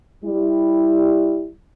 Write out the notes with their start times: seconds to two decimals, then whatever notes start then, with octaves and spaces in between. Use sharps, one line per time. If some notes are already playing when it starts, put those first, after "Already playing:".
0.25 G3 E4